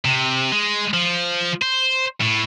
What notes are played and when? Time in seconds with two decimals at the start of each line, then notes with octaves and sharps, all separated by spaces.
0.05 C3
0.52 G#3
0.94 F3
1.62 C5
2.21 A2